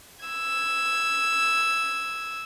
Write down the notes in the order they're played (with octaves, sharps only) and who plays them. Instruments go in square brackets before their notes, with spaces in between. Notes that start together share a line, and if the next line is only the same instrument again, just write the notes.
[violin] E6 G#6